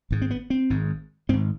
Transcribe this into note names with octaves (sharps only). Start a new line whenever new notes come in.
G#1 G#2
C4
B3
C4
G#1 G#2
G#1 G#2 C4